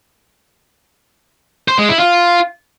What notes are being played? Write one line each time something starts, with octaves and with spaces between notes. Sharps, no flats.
C5
G#3
E4
F4